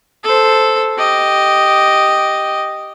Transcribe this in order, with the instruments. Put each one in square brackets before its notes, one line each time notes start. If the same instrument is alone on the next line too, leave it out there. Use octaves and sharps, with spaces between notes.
[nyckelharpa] A4 C5
G4 D#5